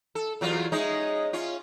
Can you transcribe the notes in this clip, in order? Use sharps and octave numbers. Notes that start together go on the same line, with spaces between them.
A4
E2 F#3 F4
G#3 C#4 D#4
C#4 F4